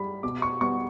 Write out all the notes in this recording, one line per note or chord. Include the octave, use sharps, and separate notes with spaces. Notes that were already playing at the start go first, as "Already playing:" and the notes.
Already playing: G3 B5
B2 D6
C#6
G3 B3 C#6